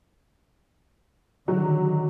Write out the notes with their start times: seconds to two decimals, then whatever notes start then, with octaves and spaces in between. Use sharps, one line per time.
1.48 D3 D#3 F#3